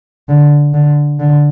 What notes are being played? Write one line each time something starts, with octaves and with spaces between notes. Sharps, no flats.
D3
D3
D3